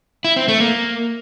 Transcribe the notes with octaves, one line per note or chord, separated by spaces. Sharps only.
E4
C4
A3
A#3